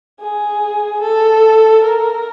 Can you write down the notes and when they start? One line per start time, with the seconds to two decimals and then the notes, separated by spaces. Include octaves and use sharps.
0.20 G#4
1.01 A4
1.84 A#4